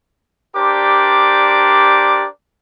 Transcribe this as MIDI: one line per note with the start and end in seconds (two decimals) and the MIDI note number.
0.56 2.26 62
0.56 2.26 67
0.56 2.26 70
0.56 2.26 72
0.56 2.26 74
0.56 2.26 86